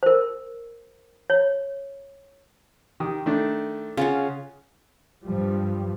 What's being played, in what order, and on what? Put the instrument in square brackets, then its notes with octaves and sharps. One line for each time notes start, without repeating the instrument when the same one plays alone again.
[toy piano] A#4 C5
C#5
[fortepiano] D#3 G4 D#6
D#3 A3 D4
[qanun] C#3 C#4 F#5 [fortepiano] F4
[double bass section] G2 F3 G3